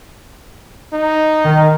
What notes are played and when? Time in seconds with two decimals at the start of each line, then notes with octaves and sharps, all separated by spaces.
0.93 D#4
1.44 D#3